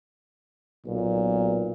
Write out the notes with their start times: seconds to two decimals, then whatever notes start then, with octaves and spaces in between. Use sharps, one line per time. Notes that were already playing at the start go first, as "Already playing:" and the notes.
0.86 B1 A#2